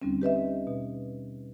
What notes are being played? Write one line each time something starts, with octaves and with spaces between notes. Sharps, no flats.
D#2 D3 G3 C4 C#4
G4 B4 D#5 E5
B2